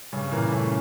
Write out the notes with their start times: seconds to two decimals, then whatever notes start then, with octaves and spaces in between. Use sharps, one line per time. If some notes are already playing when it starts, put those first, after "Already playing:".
0.13 G2 C#3 C#4
0.32 A#2 E3 A#3
0.52 C#3 A3 C#4